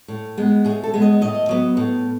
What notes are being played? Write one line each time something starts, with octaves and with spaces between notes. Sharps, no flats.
A2
G#3 B3
A2 G#4
A4
G#3 B3
D#5
A2 D#5
F#3 B3
A2